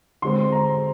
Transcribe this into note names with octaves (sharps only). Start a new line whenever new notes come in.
D3 G#3 C4 C6
A#5